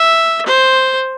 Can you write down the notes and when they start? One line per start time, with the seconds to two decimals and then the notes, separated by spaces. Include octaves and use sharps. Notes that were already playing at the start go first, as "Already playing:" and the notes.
Already playing: E5
0.46 C5